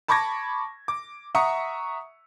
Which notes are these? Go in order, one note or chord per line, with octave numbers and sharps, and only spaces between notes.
A5 B5 C#6 D6 G#6 A#6
D6
E5 F#5 A#5 C#6 D#6 C#7